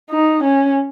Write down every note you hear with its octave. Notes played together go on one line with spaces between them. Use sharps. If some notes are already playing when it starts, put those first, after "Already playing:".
D#4
C#4